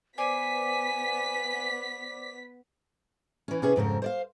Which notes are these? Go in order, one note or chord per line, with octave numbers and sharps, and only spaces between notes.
B3 C5 D5 G#5 D6 B6
E3 C#4
C3 C#4 G#4
F2 G#2 C#3 A#4
C5 D5 F5